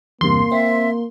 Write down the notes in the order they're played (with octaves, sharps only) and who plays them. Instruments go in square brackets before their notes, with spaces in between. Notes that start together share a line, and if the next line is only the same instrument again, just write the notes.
[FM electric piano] E2 G2 C3 [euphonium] A#3 [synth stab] C6
[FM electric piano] C4 [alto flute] E5